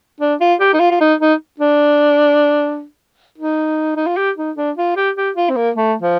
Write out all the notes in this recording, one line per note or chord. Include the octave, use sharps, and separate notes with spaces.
D4
F4
G4
D#4
F4
F4
D#4
D#4
D4
D#4
D#4
F4
G4
D#4
D4
F4
G4
G4
F4
C4
A#3
A3
F3